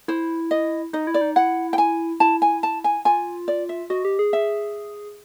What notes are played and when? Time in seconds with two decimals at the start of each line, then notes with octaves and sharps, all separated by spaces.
0.08 E4 C5
0.51 D#5
0.93 D#4 D#5
1.07 E4
1.14 D5
1.21 D#4
1.36 E4 F#5
1.73 G5
1.78 G#5
2.20 E4 A5
2.42 G#5
2.63 A5
2.84 G#5
3.05 F4 G#5
3.48 D5
3.69 E5
3.90 F#4 D#5
4.05 G4
4.19 G#4
4.33 E5